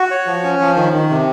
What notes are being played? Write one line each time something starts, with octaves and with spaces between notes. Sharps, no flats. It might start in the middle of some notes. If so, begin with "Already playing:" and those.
Already playing: F#4
C#5
F3
C#4
F3
D#3
D#3
C3